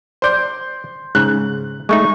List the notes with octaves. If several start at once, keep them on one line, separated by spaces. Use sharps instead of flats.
C5 D5 C6 G6
G#2 C#3 F#6
G#3 A3 D#4 C#6